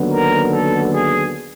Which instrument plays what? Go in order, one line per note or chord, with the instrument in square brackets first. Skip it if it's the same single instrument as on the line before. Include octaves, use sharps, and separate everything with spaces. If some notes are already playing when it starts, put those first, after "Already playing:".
Already playing: [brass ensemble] D#2 D3 F#3 B3
A#4
A4
G#4